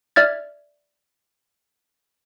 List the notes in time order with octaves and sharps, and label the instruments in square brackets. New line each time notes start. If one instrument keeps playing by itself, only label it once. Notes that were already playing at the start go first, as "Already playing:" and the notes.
[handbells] D5 E5 F6 G#6 A6